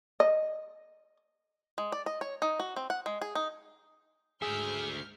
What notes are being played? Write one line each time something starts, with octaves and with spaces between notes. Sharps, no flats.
D#5
G#3
D5
D#5
C#5
D#4
F#4
C4
F#5
G#3
G#4
D#4
D2 G#2 G#4 E5 F6 G6